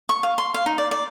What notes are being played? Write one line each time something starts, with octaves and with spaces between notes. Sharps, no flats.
C#6
F5
C6
F5
D#4
D5
D5